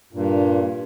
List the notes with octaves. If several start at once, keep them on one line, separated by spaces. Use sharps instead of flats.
G2 A#2